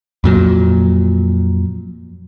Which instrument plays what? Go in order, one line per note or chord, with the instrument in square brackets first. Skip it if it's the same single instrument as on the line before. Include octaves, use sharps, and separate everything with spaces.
[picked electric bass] F2 A#2 F#3